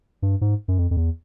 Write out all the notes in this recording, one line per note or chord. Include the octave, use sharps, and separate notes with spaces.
G2
G#2
F#2
F2
F2
E2